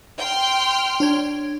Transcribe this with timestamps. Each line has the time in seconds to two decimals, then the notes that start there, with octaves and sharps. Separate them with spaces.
0.18 G5 C6 F6
1.00 D4 C#5 G#6